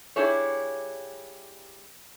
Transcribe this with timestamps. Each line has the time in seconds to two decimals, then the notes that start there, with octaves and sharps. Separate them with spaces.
0.16 G3 D4 E4 G#4 C#5